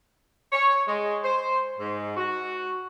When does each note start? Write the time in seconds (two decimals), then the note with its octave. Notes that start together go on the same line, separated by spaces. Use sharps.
0.52 C#5
0.87 G#3
1.24 C5
1.79 G#2
2.17 F#4